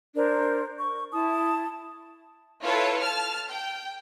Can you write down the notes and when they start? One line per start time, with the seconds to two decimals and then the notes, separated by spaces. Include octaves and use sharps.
0.15 D4 A#4 C5
0.78 C#6
1.12 E4 A5 D#6
2.63 E4 F4 A4 B4 C#5
3.01 A5 F6
3.51 G5